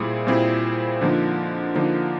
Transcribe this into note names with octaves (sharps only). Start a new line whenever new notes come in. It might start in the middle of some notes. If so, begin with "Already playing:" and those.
Already playing: A#2 G3 C4 E4 G#4
A#2 G3 C4 E4 G#4
D3 F3 A#3 D#4
D3 F3 A#3 D#4